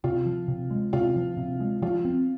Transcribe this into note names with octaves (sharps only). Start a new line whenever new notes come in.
C3 F4
F3
C3
G#3
C3 F4
F3
C3
G#3
F3 F4
C4